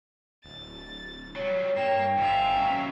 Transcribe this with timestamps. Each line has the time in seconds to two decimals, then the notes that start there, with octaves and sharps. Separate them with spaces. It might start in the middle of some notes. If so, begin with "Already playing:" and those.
0.45 D1 A6
1.35 F#3 G3 C#5
1.77 G2 A#3 C#5 G5 E7
2.17 G#1 G#2 E5 F5
2.57 D#2 F#3 C#4